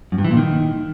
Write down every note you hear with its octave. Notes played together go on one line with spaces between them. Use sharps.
F#2
G2
E3
A#2
D#3